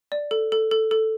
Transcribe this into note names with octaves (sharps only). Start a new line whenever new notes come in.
D5
A4
A4
A4
A4